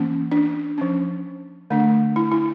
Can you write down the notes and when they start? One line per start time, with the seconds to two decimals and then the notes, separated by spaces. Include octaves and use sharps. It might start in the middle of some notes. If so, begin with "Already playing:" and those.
Already playing: E3 A#3 C#4
0.32 D4
0.78 F3 C#4
1.70 D3 A3 D4
2.16 E4
2.32 E4